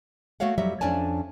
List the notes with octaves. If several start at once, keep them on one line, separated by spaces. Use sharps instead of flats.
A3 A#3 F#4 C#5 F5 F#5
F2 F#3 G3 E5
F2 C#4 D4 D5 G#5 A5